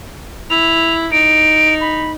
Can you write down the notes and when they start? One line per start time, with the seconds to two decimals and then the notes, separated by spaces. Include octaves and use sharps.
0.50 E4 F7
1.12 D#4 D7
1.81 B5